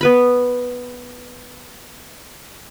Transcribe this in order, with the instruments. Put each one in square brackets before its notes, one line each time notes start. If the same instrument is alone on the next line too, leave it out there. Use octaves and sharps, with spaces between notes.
[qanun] B3 B4 B5